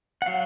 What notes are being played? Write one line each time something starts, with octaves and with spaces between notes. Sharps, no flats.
F#5
F#3 F5